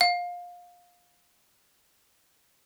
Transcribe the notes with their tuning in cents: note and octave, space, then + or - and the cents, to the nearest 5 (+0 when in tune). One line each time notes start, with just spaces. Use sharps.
F5 +20